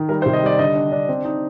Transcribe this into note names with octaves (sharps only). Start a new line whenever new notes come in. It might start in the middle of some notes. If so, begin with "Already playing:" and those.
Already playing: D#3
G3 A#4
C5
C3
D#5
G3 D5
D3 D#5
D4
D4
C4
D#4